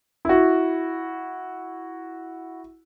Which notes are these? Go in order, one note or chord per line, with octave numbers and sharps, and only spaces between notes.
E4 F#4